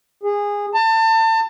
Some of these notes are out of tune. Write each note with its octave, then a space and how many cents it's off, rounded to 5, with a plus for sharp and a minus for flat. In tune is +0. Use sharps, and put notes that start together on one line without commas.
G#4 -20
A5 +30